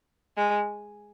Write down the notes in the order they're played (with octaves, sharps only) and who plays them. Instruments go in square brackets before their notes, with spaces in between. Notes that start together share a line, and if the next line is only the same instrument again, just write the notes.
[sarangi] G#3